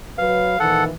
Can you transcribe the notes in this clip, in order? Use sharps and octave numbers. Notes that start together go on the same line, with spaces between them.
F#3 B4 F5
A#2 D#3 E3 A4 F#5